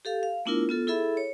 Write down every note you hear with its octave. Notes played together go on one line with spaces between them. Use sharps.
G4 A4 F5
F5
A3 B3 D4 E4 F4 A#4
B3 F4 A4
E4 G#4 A4 E5 B5
C#5